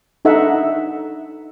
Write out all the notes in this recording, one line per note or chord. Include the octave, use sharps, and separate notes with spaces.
D4 D#4 A4 E5 F#5